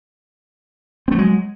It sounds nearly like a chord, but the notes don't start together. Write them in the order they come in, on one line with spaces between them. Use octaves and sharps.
C4 A3 F#3 G#3